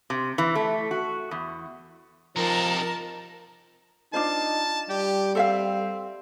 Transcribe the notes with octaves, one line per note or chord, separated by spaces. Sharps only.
C3
E3
A3
F#4
E2
C3 F3 D#4 A#4 A5
D4 D#4 F4 C5 A5
G3 G4
C4 A4 E5 F5